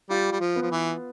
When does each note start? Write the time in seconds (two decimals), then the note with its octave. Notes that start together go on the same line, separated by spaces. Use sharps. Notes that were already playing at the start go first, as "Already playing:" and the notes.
0.10 G3 F4
0.32 G3
0.40 F3
0.56 B3
0.62 F3
0.71 E3